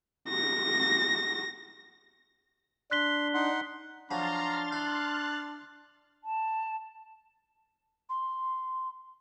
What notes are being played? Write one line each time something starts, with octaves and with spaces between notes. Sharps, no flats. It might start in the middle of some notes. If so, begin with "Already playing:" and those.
A#6
D4 C6 F#6 B6 G7
D#4 F#5 C6
F3 F#3 D4 A#5 C6 F6 A6
E4 F#6
A5
C6